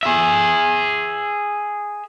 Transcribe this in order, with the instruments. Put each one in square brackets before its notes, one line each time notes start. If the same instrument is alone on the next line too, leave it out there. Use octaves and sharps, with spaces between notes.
[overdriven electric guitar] G#4 E5